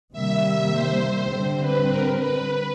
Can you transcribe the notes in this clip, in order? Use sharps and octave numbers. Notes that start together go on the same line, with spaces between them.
C3 D#3 G3 A#3 E5
C5
D3 G3 C4
B4
A#4
B4